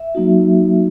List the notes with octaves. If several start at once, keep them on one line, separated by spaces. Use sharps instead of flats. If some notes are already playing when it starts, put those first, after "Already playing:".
Already playing: E5
F#3 A#3 D#4 F#4